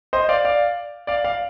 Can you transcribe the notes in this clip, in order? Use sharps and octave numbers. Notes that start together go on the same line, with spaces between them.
C5 D#5
D5 F5
D5 F5
D5 F5
D5 F5